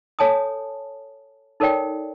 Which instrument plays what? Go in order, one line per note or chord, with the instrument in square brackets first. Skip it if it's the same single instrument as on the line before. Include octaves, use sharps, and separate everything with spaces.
[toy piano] A4 C#5 G#5 A5 D#6
D#4 A4 A#4 C#5 D5 G5